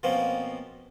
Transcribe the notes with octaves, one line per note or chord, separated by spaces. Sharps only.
B2 F3 A#3 C4 C#4